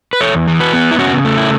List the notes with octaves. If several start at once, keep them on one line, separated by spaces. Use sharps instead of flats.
B4
E2 A4 C#5
E3
F#4 B4
B3
E4
C#3 C#4 F#4
A3
E4